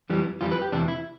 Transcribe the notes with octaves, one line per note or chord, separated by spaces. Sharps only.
F2 E3 G3
F2 E3 G3 F4
B4
G4
E2 C3 E3 D4
E4